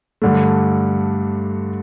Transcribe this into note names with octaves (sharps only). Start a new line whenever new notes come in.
G2 D3 A3